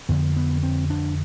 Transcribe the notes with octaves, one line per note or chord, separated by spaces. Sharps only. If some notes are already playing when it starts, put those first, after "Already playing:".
F2 D3 B3
B3
C4
D4